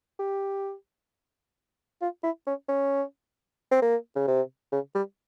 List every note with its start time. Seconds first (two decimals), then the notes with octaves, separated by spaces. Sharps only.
0.19 G4
2.01 F4
2.23 E4
2.47 C#4
2.68 C#4
3.71 C4
3.82 A#3
4.16 C#3
4.28 C3
4.72 C#3
4.95 G3